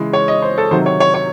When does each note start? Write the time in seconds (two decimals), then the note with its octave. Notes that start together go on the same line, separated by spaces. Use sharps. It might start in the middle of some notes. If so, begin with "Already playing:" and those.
Already playing: C#3 E3 G#3
0.13 C#5
0.28 D#5
0.42 C5
0.58 A4
0.71 C3 D#3 F#3 C5
0.86 C#5
1.00 C#5
1.14 C#5